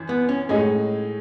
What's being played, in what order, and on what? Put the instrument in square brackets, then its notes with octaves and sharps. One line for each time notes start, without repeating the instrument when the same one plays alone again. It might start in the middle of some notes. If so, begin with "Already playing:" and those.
Already playing: [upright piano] F#2 E3
[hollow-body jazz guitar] B3
C#4
[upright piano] A2 G#3 D#4 G#4 [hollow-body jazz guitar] C#4